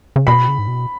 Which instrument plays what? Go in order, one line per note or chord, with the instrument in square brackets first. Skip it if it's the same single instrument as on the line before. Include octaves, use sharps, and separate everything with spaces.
[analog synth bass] C#3
[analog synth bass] B2 [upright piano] B5
[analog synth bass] C#3
G#2
B2